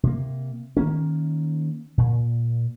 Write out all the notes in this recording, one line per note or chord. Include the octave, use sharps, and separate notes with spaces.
C3 A#3
D#3 A#3 C#4
A#2